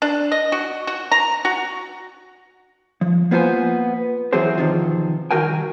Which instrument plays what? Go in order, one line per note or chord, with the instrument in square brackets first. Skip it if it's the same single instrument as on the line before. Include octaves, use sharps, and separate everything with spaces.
[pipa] D4
D#5
F#4
F#4
A#5
F#4
[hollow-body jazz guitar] F3
A#3 B3 F4 C5 G#5
E3 F#3 C4 F#4 G#4 C5
E2 C3 D#3 F3
C2 D#3 F#4 A#4 G5 G#5